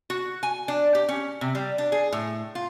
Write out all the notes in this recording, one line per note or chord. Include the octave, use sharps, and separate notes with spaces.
F#4
G#5
D4
G4
C#4
C3
G3
D4
G#4
A2
F4